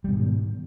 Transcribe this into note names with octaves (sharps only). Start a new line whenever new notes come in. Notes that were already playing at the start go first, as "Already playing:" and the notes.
G#2 B2 D#3 G3